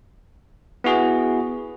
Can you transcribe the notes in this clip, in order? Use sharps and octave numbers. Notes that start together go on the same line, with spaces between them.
B3 E4 F#4 G#4